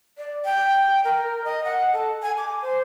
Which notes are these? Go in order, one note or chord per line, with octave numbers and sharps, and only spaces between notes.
D5
G5
A#4
D#5
F#5
A4
G#5
D6
C5